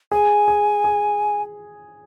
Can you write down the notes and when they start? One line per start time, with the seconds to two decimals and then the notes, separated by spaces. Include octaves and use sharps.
0.12 G#4 G#5
0.48 G#4
0.84 G#4